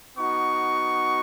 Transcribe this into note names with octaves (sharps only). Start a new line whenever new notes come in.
B3 D#4 F#4 C#6